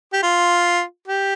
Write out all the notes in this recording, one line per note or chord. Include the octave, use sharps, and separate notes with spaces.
G4
F4
G4